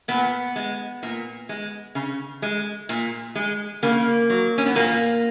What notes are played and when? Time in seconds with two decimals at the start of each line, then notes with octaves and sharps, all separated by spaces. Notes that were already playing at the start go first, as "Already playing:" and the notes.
0.08 A#2 B3
0.56 G#3
1.03 A#2
1.49 G#3
1.95 C#3
2.42 G#3
2.89 A#2
3.35 G#3
3.83 C#3 A#3
4.30 F#3
4.58 C#4
4.66 B3
4.75 A#2 A#3